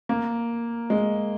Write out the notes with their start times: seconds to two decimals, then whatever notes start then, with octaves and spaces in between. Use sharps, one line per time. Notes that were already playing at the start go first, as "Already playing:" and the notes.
0.09 A#3
0.90 G#3